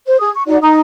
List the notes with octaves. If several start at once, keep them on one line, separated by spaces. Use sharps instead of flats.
C5
G#4 D#6
C#6
D#4 F#4 D5 F#5
D#4 A#5 D#6